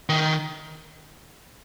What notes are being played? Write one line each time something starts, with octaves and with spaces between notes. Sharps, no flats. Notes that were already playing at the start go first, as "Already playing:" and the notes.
D#3